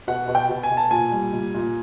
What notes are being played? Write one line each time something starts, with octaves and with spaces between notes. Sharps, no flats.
B2 F#5
B2
G5
B2
G#5
B2
A5
A#2 G#5
G3
A#2
A#2